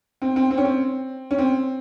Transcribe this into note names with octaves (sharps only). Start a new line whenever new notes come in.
C4
C4
C4
C#4
C4
C#4
C4